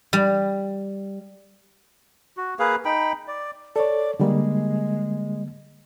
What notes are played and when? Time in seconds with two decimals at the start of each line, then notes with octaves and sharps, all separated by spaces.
0.13 G3
2.37 F#4
2.59 A#3 G#4 B4 F5
2.85 D#4 G5 B5
3.28 D5
3.76 A4 C#5 D5
4.20 D3 G3 G#3 A#3